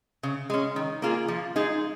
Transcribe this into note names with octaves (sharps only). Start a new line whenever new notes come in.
C#3
G#3 C#4
D#3
A#3 F4 G#4
F3
G#3 D#4 G#4